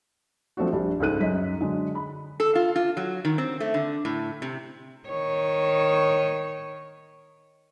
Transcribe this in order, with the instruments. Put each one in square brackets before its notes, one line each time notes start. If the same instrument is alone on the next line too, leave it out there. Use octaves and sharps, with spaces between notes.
[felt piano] F3 A3 C4 D4 F#4
A#1 G3 D4
C#2 G#2 A4 F#6 D#7
F#2 D#5 B6
D3 F#3 G#3
B5
[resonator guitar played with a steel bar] A4
F4
F4
F#3
D#3
C4
A3
D3
A2
C3
[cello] D#3 C#5